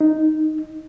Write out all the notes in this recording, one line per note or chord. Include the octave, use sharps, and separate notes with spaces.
D#4